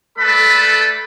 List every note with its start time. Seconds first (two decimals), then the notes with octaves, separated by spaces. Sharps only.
0.19 A3 A4 B4 D5 B5